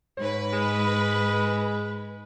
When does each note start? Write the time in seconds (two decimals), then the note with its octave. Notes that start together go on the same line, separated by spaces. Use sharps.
0.17 G#2 B4 C#5
0.53 G#3